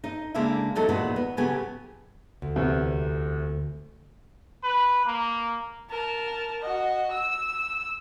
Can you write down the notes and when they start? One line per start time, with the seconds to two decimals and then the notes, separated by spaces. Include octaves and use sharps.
0.04 D#4 D#5
0.34 C#3 G#3 A#3 D4 E4 E5
0.75 E2 F#3 D#4 A4
0.89 E2 A#2 D#3 F#4 B4
1.16 B3
1.37 A2 C#3 F#3 B3 G4 G#5
2.42 D2
2.56 E2 C3
4.63 B4
5.06 A#3
5.90 A#4 A5
6.61 F#4 D#5
7.11 E6